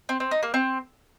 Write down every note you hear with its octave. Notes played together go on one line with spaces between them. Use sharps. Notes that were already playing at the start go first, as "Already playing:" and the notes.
C4
C4
D#4
A#3
C4